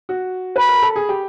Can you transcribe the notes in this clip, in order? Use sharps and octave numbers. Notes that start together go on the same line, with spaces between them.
F#4
B4 B5
A#4
A4
G#4
G4